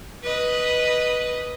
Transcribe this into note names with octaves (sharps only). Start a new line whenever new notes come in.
B4 D#5